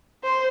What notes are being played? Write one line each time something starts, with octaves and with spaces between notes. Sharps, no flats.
C5